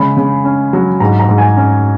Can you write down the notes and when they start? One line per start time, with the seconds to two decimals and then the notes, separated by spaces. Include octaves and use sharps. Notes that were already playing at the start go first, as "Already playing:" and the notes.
Already playing: C#3 G#3 B5
0.17 C#3
0.45 C#4
0.73 F#3
1.00 G#2 A#5
1.20 A#5
1.29 G#2
1.38 G#5
1.56 C#4